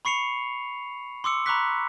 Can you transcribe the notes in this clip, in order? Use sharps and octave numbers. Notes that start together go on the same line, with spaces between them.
B5 C#6 C7 C#7 F7
C6 D6 E6 C#7
A#5 B5 C#6 D6 F#6 B6